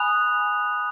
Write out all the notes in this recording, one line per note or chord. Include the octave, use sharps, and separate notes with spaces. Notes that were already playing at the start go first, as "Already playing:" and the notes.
Already playing: G#5 B5 D#6 F#6 F7